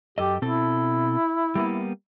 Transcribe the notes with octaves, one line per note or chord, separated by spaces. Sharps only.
F#2 G4 A4 D#5
B2 C4 E4 A4
G3 A#3 B3